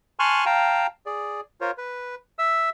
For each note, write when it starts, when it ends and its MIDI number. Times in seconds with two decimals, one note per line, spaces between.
0.19 0.45 80
0.19 0.45 81
0.19 0.45 84
0.19 0.45 85
0.19 0.45 89
0.19 0.45 90
0.46 0.87 77
0.46 0.87 79
0.46 0.87 81
0.46 0.87 82
1.06 1.41 68
1.06 1.41 74
1.61 1.71 65
1.61 1.71 70
1.61 1.71 72
1.61 1.71 73
1.78 2.15 71
2.39 2.70 76
2.39 2.70 88